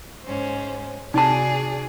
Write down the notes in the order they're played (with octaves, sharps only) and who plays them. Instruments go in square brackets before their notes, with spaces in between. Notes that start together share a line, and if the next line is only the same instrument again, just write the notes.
[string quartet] G#2 C#4 C5
[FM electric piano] C3 [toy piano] D#4 A5 [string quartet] F#4 G#4 D5